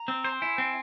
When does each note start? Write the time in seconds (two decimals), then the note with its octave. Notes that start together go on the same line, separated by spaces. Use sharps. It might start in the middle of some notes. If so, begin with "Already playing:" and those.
Already playing: A#5
0.08 C4
0.24 C5
0.32 G5
0.41 E4 G#5
0.58 C4